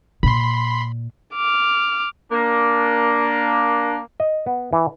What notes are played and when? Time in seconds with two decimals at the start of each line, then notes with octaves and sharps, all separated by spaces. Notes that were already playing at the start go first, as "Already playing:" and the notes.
0.23 A#2 B5 C6
1.34 D6 F6
2.32 A#3 D4
4.20 D#5
4.46 B3
4.73 E3